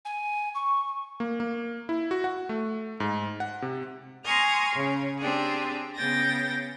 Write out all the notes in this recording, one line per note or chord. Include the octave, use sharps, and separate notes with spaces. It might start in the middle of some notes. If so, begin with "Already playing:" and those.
G#5
C#6
A#3
A#3
E4
F#4
F#5
A3
G#2
F#5
C3
G#5 A#5 C6 C#6 D#6 F6
C#3 C#4
C4 D4 G4 G#4
C#3 B3 G5 A6 A#6